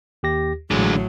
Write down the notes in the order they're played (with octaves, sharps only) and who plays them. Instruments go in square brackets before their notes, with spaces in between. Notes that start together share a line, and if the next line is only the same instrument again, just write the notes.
[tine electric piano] D#2 G4 A#6
[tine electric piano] A1 [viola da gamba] A2 F#3 [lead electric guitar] D3 G#3